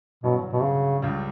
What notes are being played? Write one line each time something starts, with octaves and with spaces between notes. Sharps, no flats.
A1 G2 B2 D3 F#3 C#4
B2
C#3
C#2 C#3 G3